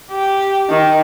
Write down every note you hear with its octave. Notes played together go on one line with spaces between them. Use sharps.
G4
D#3